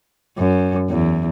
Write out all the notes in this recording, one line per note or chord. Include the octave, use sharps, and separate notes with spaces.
F#2
E2